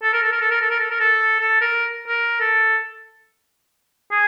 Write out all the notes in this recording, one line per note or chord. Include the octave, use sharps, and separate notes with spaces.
A4
A#4
A4
A#4
A4
A#4
A4
A#4
A4
A#4
A4
A4
A#4
A#4
A4
G#4